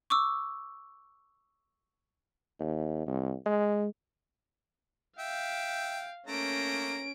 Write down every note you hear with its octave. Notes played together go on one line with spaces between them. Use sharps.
C#6 D6 E6
D#2
C2
G#3
E5 F5 G5
A3 A#3 C#4 A#5 D7